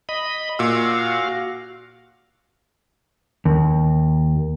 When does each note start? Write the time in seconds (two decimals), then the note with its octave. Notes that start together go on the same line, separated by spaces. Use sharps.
0.09 D#5 B5
0.59 A#2 F#4 F5 E6
3.45 D#2